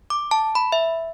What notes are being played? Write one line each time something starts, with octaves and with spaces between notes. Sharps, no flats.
D6
A5
B5
E5